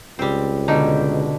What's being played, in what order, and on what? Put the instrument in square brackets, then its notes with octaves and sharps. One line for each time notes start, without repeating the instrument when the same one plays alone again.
[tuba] C#2 [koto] G3 C4
[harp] B2 D3 [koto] D#4